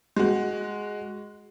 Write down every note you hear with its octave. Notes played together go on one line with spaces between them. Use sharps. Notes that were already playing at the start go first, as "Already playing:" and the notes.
G#3 F#4